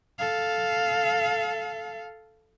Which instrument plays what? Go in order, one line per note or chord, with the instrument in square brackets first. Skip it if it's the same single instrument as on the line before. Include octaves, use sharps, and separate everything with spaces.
[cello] A4 F5